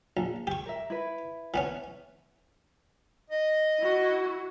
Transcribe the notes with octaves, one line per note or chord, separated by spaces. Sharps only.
A#1
G4 C#6
A#4 E5
E4 B4
E3 B3 C#4
D#5
E4 F#4